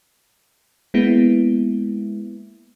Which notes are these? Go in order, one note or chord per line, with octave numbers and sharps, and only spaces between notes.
G#3 A#3 B3 E4